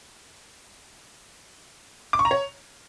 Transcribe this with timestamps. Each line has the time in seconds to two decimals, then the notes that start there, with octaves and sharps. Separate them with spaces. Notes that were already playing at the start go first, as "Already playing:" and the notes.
2.13 D6
2.19 C#6
2.25 A#5
2.31 C#5